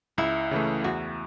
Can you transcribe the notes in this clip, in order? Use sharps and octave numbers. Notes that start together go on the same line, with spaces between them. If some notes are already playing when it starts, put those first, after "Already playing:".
C#2 E4
C#3 E3 A3
E2 F#4